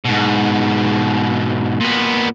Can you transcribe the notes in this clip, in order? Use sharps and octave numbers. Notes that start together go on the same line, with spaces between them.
G#2 B2
A#2 B3